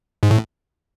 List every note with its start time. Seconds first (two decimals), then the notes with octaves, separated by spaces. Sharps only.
0.23 G#2
0.31 A2